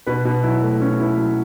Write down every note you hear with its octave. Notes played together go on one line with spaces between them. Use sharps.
B2 B4
B2
F#3 E4
A3
B2 C#4
B2 E4
F#3 E4